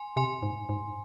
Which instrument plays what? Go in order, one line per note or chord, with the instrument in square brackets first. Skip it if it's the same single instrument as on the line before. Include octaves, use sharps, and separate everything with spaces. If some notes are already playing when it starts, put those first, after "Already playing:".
Already playing: [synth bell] G#5 C6
[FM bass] C3 [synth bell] G#5 C6
[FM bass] G#2
G#2